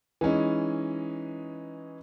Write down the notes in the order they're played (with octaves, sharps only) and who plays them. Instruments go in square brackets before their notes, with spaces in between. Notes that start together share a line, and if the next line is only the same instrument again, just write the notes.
[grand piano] E3 G#3 C#4 D#4